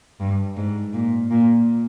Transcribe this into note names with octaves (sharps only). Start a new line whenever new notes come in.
G2
G#2
A#2
A#2